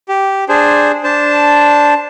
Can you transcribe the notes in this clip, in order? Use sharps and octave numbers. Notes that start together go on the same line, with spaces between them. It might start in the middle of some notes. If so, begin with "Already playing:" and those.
G4
D4 G#4 C5
D4 C5 A5